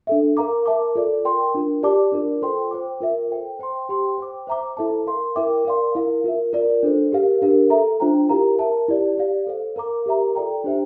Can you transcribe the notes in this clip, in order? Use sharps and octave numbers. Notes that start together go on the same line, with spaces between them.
D4 A4 E5
A#4 F5 A#5 D6
A#4 E5 A5 D6
F4 A4 D5
A#4 D5 G5 C6
D4 F4 A#4
G4 D5 A5 D6
D4 F4 A#4 D5
F4 A4 C5 G5 C6
C5 G5 D6
F4 A#4 E5
A4 C5 G5
C5 G5 C6
G4 C5 G5 C6
C5 G5 D6
C5 E5 A#5 D6
E4 A4 C5 E5 A5
A#4 F5 C6
E4 A#4 E5 G5 D6
A#4 D5 F5 C6
E4 A#4 F5
F4 A#4 E5
F4 A#4 D5
D4 A4 C5
G4 A#4 F5
D4 G4 A#4 F5
A4 E5 A#5
D4 F4 C5 G5 A#5
E4 G4 A#4 F5 A#5
A#4 E5 A5
E4 G4 D5
G4 D5 F5
A4 C5 F5
A#4 F5 A#5 D6
G4 A#4 E5 A#5
F4 A4 D5 G5 A#5
D4 G4 C5 E5 G5